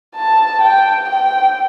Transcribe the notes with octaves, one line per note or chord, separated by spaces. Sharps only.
A5
G5
G5